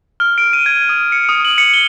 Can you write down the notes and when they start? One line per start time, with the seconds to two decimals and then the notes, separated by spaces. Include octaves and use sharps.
0.20 F6
0.38 D7
0.53 D#7
0.66 G#6
0.89 D#6
1.12 C#7
1.29 D#6
1.45 F#7
1.58 C#7
1.74 G7